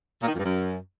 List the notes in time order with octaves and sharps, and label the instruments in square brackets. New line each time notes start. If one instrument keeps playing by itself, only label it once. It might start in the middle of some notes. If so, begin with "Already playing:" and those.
[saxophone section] A#2
D#3
F2
G2
F#2